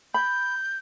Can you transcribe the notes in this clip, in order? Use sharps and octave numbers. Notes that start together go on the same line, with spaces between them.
B5 G6